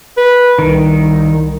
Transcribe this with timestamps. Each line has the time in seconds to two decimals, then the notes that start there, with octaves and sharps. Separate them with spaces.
0.17 B4
0.59 C2 D#3